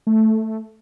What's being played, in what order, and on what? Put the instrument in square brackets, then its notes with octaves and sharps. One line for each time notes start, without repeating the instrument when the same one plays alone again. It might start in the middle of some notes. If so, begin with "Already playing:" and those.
[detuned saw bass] A3